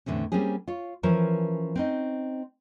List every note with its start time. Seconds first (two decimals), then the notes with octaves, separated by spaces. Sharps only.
0.06 E2 A2 D3 C4 C#4
0.32 G3 A#3 C4 C#4 G#4
0.68 F4 C#5
1.03 E3 F3 C#4 A#4 C5 C#5
1.76 C4 C#4 D#4